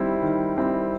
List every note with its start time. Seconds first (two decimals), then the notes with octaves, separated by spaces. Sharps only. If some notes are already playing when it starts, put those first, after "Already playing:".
Already playing: D#3 G3 C4 E4
0.22 D#3
0.57 G3 C4 E4